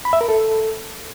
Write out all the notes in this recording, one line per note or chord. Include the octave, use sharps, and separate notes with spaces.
B5
E5
A#4
A4